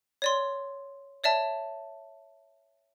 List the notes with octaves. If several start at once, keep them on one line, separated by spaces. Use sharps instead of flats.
C#5 D5 C6
C#5 D5 E5 A5